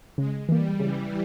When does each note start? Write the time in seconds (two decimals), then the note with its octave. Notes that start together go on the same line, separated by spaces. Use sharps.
0.18 C#3 G#3
0.49 E3 G3 A#3
0.80 C#3 E3